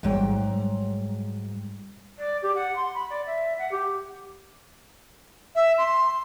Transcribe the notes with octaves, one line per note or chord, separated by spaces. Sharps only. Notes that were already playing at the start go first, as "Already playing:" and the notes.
A1 G#2 F#3 G3 G5
G3
D5
G4
F#5
C6
B5
D5
E5
F#5
G4
E5
C6